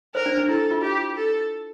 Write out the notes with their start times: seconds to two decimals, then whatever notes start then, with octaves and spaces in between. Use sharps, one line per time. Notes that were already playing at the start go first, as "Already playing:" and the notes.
0.15 A#4 C5
0.26 D4
0.37 D4
0.49 E4 A4
0.71 F4
0.82 F4 G4
1.16 A4